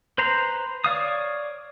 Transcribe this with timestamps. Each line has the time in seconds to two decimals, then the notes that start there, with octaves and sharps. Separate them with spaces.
0.18 B4 C5 A#5 C6
0.84 C#5 D5 F5 D#6